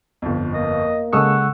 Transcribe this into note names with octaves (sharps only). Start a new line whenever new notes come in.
G1 F2
A#3 D#5
C#3 G#3 A4 F#5 C#6 D#6 E6